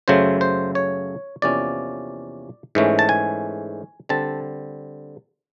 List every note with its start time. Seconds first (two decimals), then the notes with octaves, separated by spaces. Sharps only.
0.08 F#2 C#3 F#3 A3 C5
0.41 C5
0.75 C#5
1.42 E2 C3 F3 A#3 C#4 D5
2.75 G#2 E3 A3 C#4
2.99 A5
3.09 G#5
4.09 D3 G3 C4 A5